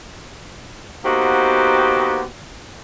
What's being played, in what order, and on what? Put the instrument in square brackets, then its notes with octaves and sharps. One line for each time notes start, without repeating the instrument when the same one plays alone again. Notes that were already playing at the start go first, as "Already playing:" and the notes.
[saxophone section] A#3 B3 D#4 F#4 G4 C5